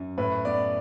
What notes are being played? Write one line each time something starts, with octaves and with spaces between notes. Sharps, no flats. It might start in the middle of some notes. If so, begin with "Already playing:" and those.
Already playing: F#2
A2 B4
B3 D5